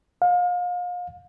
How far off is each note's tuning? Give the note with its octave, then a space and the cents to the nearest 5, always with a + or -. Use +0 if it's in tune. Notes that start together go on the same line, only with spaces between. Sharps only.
F5 +35